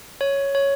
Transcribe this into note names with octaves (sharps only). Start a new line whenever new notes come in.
C#5
C#5